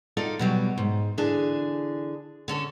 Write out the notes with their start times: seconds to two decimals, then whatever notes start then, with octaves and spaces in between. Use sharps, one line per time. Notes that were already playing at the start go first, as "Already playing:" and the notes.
0.17 D#4 F4 A4 D5
0.39 B2 F#3 G3
0.78 G#2
1.18 D3 E3 D4 G#4
2.48 D3 C#4 A4